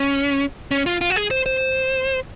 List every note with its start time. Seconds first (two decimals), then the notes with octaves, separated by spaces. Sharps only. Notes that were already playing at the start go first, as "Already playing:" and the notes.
Already playing: C#4
0.71 C#4
0.86 F4
1.01 F4
1.10 F#4
1.16 G#4
1.31 C5
1.46 C5